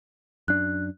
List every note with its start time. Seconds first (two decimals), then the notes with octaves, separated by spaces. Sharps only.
0.48 F#2 D4 F#6